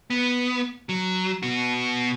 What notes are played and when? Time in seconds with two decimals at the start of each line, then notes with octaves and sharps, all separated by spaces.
0.10 B3
0.89 F#3
1.43 B2 F#4